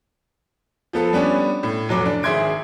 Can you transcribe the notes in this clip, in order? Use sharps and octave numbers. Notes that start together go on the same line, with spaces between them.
F3 B3 A4
G3 B3 C#4 D4
A2
F1 F#3 D6
D4
G#1 G#4 E5 C6 G#6 D7